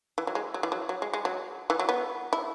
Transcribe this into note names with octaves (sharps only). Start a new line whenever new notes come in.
E3
F#3
G#3
F#3
E3
F#3
F#3
G#3
G#3
F#3
E3
F#3
B3
E4